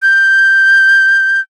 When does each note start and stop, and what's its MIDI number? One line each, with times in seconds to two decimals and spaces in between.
0.03 1.40 91